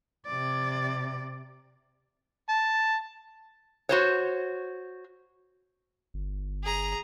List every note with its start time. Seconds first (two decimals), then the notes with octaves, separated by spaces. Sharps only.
0.26 C3 D5
2.49 A5
3.89 F#4 C5 C#5
6.14 G1
6.63 G#4 A#5